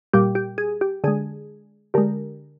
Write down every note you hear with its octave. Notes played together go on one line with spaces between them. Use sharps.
A#2 G3 G4
G4
G#4
G4
D3 G#3 G#4
D3 G#3 G4 A#4